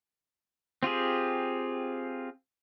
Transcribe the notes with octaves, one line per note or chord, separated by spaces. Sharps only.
C4 F4 G4 G#4